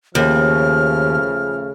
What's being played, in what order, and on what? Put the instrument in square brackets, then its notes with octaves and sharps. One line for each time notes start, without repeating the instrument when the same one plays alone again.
[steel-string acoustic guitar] D#2 [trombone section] C#3 F3 A3 [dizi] F6